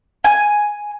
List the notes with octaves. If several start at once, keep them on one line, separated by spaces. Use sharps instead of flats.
G#5